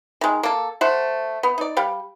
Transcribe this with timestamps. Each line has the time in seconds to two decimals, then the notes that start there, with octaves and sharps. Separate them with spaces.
0.21 D#3 G#3
0.43 A#3 A4
0.81 A3 C5 F#5
1.43 B3
1.58 D#4 D5
1.77 G3 F5 G5